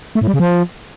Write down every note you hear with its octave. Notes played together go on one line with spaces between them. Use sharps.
A3
A2
G3
C#3
F3